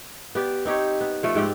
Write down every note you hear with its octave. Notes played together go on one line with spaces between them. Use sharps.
B3 G4 D5
C4 D#4 G4 C#5
B3
F3 A3 F4
G#2 C4 G4